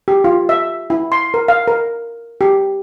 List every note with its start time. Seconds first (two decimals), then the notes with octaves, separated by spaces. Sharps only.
0.08 G4
0.24 F4
0.49 E5
0.90 E4
1.12 C6
1.34 A#4
1.48 F5
1.68 A#4
2.41 G4